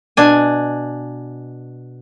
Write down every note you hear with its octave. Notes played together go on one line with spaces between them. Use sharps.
B2 D4 G#5